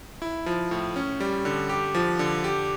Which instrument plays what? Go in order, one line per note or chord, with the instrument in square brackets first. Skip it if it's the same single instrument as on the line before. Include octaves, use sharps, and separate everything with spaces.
[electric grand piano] E4
F3
A2
C#4
G3
D3
G4
F3
D3
G4